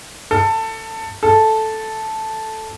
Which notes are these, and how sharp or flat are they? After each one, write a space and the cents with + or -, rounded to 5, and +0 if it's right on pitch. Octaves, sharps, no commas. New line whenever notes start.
A4 +20
A4 -5